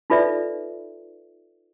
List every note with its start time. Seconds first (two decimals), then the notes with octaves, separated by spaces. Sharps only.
0.10 D#4 F4 A4 B4 D5 E5